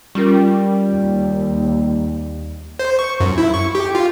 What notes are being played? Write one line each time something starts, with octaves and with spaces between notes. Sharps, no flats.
G3 C#4 F4 A#4
D#2
C5
C#6
F#2
E4
C#6
G4
F4